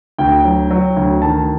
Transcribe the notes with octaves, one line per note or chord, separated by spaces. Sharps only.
D2 G5
F#3
F#3
D2
D#3 A5